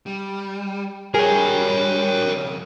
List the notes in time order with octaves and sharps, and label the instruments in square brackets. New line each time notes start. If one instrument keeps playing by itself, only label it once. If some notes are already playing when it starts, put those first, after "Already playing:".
[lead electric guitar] G3
[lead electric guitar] G3 [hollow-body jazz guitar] G#4 [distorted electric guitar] A#4 C#5
[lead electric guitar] F2 C#3